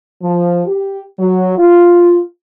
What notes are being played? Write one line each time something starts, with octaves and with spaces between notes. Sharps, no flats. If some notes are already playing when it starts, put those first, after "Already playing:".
F3
G4
F#3
F4